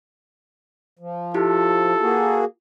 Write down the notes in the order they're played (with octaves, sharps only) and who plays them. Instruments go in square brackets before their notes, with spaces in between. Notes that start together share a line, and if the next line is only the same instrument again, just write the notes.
[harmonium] F3
[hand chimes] E4 F4 G4 [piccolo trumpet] A4
[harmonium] A#3 F#4 G#4